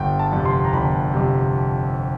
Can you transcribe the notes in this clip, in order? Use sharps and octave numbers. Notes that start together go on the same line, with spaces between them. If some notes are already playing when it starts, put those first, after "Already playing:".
Already playing: G1 G5
A5
F2 C3
C6
A#5
G1 B5
F2 C3